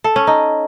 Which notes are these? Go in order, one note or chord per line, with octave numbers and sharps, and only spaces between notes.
A4
C#4
D#4